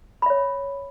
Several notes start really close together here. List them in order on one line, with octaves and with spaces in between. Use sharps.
B5 E5 C#5